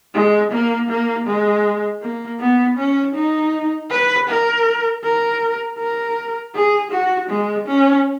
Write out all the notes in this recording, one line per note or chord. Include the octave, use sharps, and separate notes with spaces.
G#3
A#3
A#3
G#3
A#3
B3
C#4
D#4
B4
A#4
A#4
A#4
G#4
F#4
G#3
C#4